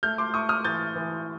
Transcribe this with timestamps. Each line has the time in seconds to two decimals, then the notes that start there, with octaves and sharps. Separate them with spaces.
0.03 A3 F6 G6
0.18 C6 D6
0.33 A3 C#6 D#6
0.49 D#6 F6
0.64 E3 G6 A6
0.96 E3